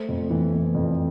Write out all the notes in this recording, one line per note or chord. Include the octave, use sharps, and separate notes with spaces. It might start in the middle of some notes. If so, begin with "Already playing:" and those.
Already playing: A3 C5
F2
E3
E3
F2